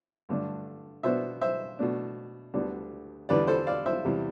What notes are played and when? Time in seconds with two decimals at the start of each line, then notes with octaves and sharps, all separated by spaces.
0.29 G2 D3 A3 D4
1.03 B2 B3 D4 C5 E5
1.41 C5 E5
1.79 B2 A3 D4
2.54 D2 D3 G3 B3 D4
3.29 E2 D3 G3 B4 D5
3.47 A4 C5
3.67 D5 F5
3.86 C5 E5
4.05 E2 C3 G3